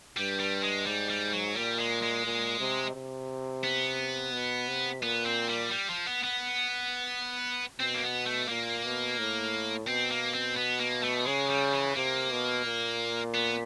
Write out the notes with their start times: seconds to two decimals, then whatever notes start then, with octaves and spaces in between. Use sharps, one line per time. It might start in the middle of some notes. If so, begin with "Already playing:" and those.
0.17 G2 G3
0.40 G3
0.64 G#3
0.86 G#2 G3
1.10 G3
1.33 F#3
1.56 A#2 G3
1.79 G#3
2.02 G#3
2.25 A#2
2.60 C3
2.95 C3
3.64 B3
4.33 B2
4.68 C3
5.03 A#2 B3
5.26 C4
5.49 G3
5.72 G3
5.89 F3
6.07 B3
6.24 B3
7.80 B2 C4
7.94 A#3
8.03 B3
8.26 A3
8.49 A#2 A#3
8.84 B2
9.18 A2
9.88 B2 C4
10.11 A#3
10.34 C4
10.57 B3
10.80 A#3
11.03 A3
11.26 C#3 G#3
11.50 G3
11.73 E3
11.95 C3 A#3
12.31 B2
12.65 A#2
13.35 B3